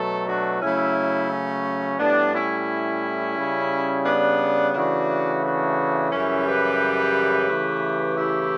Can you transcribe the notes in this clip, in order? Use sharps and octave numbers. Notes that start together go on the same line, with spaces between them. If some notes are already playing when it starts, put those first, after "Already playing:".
Already playing: B2 F#3 A3 A4
D4 F#4
C#3 F#3 A3 C#4 E4
C#4
A2 G3 B3 D4
C#4 E4
C#3 G3
B3 D4
C#3 E3 A3 D4 F#4
D4 F#4
F#2 C#3 E3 G3 C#4 E4
G4 B4
C#3 E3 A3
E4 G4